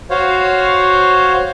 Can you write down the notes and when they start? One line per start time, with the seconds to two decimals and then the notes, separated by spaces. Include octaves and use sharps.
0.10 F#4 C5 C#5 F5